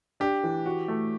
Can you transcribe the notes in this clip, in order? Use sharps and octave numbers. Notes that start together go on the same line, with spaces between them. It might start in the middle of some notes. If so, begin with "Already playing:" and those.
D4 G4
E3
F#4
A3